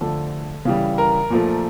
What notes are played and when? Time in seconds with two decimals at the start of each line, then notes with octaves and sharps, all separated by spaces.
0.01 D3 F3 A3 A4
0.65 C#3 E3 G3
0.98 A#4
1.30 A#2 F3 A3